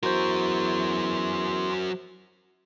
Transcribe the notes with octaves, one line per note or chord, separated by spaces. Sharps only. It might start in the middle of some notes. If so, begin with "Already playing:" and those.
E2 F#3 F#4 A#4 C5 C6